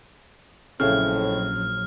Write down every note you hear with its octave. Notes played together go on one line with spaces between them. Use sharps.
A#1 F2 A2 C#3 F#3 F6